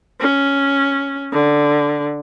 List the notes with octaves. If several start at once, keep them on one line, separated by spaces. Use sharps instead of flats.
C#4
D3